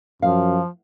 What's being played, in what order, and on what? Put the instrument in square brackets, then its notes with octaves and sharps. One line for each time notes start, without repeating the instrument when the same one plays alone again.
[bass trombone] F#2 [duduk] F3 [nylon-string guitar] F5